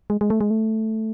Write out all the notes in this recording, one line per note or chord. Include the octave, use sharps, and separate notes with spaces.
G#3
G#3
A3
G#3
A3